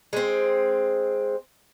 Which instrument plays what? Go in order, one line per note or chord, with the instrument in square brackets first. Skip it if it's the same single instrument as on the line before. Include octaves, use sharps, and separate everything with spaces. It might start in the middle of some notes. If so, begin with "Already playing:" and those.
[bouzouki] G#3 C4